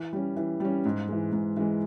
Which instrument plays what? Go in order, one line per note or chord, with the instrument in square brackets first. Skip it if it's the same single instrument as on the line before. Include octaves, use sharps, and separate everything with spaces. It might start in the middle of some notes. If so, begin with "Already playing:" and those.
Already playing: [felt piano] E3
G3 C#4
E3
G3 C#4
G#2
E3 G#3
G#2
E3 G#3